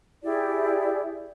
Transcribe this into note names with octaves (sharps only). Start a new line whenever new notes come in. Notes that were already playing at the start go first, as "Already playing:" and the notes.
E4 G4 G#4 D5